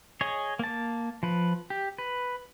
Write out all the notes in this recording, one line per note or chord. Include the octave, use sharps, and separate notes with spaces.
G#4 C#5 D#5
A#3 A5
F3 B4
G4
B4